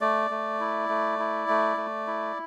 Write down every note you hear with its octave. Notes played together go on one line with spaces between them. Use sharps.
A3 D5
A3
E4
A3
E4
A3
A3
E4